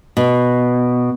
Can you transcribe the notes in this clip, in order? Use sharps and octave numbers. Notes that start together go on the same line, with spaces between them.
B2